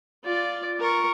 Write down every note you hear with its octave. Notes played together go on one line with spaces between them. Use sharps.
F4 D5
A#4 C#6